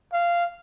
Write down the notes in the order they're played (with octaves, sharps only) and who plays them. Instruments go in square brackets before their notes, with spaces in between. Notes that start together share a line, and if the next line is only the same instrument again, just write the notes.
[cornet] F5